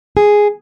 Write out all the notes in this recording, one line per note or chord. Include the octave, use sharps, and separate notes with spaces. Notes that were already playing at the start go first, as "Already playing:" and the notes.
G#4